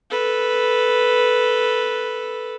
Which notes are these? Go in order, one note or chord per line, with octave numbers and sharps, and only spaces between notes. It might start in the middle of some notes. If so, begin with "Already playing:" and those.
A4 B4